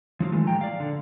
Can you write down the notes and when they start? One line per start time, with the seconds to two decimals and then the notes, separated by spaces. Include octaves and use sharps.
0.20 F3 F#3 D4 F4
0.32 D#3 E3 G#3 A3
0.47 A#2 G#3 G5 A#5
0.61 D5 F5
0.80 D3